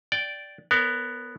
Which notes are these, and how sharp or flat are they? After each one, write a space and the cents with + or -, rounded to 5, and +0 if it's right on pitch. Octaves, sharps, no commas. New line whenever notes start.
D5 -5 G5 -15
B3 +0 A#4 -25 C#5 +15